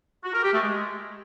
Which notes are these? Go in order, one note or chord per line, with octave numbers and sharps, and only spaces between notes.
F#4
A#4
G4
A3
G#3